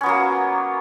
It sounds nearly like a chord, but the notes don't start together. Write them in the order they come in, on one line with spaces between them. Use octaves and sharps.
C#4 B3 F#3 A#3